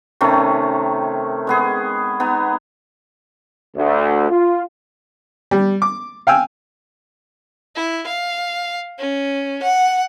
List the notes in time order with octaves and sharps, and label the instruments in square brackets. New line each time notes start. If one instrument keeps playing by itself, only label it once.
[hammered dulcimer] C3 D#3 A3 C#4
G#3 B3 G#4
B3 D#4
[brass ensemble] D2
F4
[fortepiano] G3
D6
F5 G5 G#5 E6
[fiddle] E4
F5
C#4
F#5